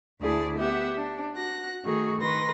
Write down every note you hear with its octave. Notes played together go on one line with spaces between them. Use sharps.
D2 A3 E4 G#4 D5 A5
B3 G4 E5 F#5
D4
F#4 F#6 A#6
D#3 A3 F#4 G#4
D#3 B4 C6 A#6